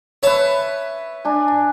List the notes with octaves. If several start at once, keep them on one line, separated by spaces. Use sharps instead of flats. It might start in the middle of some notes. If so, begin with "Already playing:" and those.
B4 C#5 E5 A5
D4 G#5